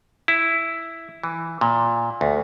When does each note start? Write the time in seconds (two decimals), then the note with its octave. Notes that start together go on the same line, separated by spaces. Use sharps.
0.28 E4
1.24 E3
1.61 A#2
2.21 D2